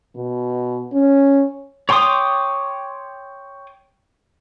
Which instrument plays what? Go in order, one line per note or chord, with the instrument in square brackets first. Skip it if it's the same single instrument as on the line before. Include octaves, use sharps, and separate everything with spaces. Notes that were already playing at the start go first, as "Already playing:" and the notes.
[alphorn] B2
C#4
[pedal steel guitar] C#5 G5 C6 D6 D#6